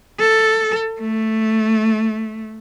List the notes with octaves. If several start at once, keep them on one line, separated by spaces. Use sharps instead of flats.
A4
A3